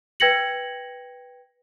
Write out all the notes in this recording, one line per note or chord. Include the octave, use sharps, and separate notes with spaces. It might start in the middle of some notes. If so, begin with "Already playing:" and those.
B4 G5 G#6 A#6 C#7 F#7